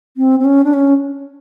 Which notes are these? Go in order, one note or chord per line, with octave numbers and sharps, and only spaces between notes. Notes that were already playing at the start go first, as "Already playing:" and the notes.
C4
C4
C#4
D4
C#4